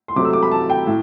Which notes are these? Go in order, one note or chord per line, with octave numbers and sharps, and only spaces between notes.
C6
C3 F#3 A3 D6
E6
D6
B5
A5
G5
A2